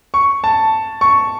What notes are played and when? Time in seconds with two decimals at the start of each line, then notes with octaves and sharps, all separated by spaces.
0.14 C#6
0.44 A5
1.01 C#6